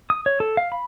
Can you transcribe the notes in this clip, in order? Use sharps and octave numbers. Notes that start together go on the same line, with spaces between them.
D#6
C#5
A4
F5
B5